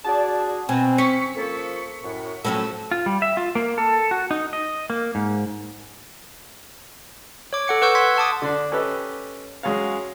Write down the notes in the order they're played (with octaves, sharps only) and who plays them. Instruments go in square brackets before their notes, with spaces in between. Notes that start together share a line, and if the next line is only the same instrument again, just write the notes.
[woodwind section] D4 F#4 G#4 [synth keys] D5 A5
[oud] B2 [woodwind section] C4 [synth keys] G#5
[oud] C#4 [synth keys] C#6 B6 C#7
[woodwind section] F3 A#3 A4
F#2 A2
[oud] A2 F#3 C#4 [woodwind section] F3 A4 E6
[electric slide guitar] F4
G3
E5
F4
A#3
A4
F#4
D#4
D#5
A#3
G#2
[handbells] C#5 D6
A4 F#5 C#7
B4 F#5 C#6 E6 G6
C6 G#6 B6
F#5 A5 D6 D#6
[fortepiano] D3 D4
C#4 G4 A4 B4 D#5
F#3 G#3 C#4 C#5 F5